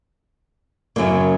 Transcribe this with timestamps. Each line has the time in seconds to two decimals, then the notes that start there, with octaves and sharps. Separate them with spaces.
0.96 F#2 C#3 F#3 A#3